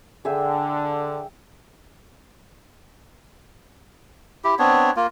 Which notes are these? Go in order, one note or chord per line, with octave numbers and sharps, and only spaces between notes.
D3 G#4 E5 G5
E4 G4
B3 C4 D4 C#5
A#3 F4